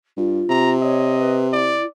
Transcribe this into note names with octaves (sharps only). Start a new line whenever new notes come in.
G2 F4
C3 A#5
C#5 D#5
B4
E4 D5